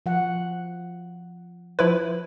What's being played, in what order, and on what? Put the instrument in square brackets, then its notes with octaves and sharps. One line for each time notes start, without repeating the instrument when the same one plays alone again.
[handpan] F3 F#5
[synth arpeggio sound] F3 E4 B4